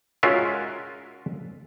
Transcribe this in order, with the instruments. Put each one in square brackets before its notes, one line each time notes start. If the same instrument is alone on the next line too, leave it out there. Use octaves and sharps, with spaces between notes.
[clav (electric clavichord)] G#3 C#4 F4 F#4 A#4 E5